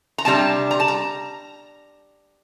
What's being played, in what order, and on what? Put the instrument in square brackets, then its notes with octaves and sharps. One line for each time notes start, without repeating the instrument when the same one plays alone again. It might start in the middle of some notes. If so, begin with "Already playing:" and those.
[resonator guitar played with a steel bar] A#5
C3 G3 D4 A5
A#5
A5
A#5